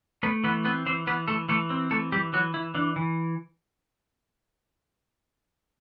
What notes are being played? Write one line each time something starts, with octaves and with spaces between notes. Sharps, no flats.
A3 B3 B4
E3 B3 B4
B3 C4 B4
E3 C4 C5
E3 B3 B4
E3 A3 A4
E3 A3 A4
C4
E3 A3 A4
E3 G3 G4
E3 F#3 F#4
E3 E4
E3 D4
E3